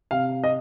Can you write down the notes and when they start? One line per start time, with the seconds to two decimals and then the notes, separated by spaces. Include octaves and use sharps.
0.11 C3 F5
0.44 D#5